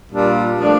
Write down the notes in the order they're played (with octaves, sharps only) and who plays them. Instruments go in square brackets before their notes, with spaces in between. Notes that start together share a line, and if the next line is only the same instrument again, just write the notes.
[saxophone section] A#2 G3 D4 F4
F3 A3 D4